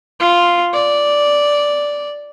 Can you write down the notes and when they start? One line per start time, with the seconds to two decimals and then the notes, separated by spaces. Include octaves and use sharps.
0.20 F4
0.74 D5